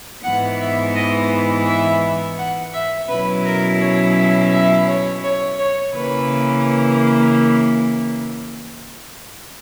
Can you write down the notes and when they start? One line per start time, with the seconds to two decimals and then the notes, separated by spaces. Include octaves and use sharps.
0.23 G#2 E3 B3 F#5
0.59 E5
0.95 D#5
1.67 E5
2.37 F#5
2.73 E5
3.08 B2 F#3 C#4 E4 B4
3.44 A#4
3.80 C#5
4.16 E5
4.52 E5
4.87 C#5
5.23 C#5
5.58 C#5
5.94 C#3 E3 A#3 B4